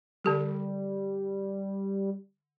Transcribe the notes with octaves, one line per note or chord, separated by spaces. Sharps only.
D3 G3 G4 A4